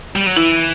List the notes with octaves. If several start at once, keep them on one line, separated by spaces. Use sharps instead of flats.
G3
F#3
E3 E4